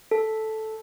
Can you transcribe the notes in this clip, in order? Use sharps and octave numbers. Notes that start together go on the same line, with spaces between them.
A4